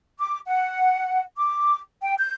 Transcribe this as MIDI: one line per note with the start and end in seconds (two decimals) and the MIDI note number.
0.19 0.39 86
0.47 1.21 78
1.36 1.78 86
2.02 2.15 79
2.19 2.34 91